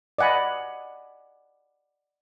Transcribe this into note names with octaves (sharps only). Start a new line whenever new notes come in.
D5 D#5 F#5 G#5 B5